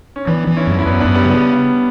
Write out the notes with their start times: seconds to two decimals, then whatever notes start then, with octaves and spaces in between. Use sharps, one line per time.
0.16 C#4
0.27 E3 B3 D4
0.47 E3
0.57 C#4 E4
0.67 F#2
0.79 E4
0.85 F#2 B3 D4
1.00 B3 D4
1.05 F#2
1.15 G3 B3
1.25 C#3 G3 B3